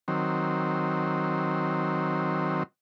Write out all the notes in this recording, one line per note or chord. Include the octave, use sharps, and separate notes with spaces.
D#3 F#3 C4